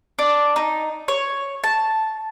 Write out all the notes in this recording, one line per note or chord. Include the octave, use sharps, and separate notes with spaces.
D4
D#4
C#5
A5